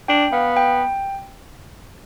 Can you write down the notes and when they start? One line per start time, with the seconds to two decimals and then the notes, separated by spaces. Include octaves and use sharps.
0.08 D4 G5
0.33 B3 F5
0.57 G5